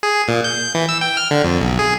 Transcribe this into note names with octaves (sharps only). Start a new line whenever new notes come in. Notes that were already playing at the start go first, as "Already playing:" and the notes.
G#4
A#2
G6
E3
E6
G5
F6
D3
F2
B1
G#4